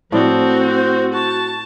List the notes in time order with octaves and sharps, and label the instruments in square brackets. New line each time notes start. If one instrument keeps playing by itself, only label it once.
[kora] A2 D5 [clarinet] F3 [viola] C4 F#4
[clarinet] C5
[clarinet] F#4 [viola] A5